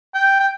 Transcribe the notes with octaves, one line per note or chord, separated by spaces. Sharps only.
G5
G5